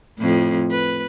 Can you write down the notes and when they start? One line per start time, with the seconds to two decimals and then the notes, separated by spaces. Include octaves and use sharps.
0.18 F2 A2
0.71 B4